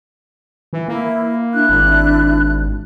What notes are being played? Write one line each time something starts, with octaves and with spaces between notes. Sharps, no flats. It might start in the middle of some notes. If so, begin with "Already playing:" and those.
E3
A#3 E4
D4 E4 F#6
G#1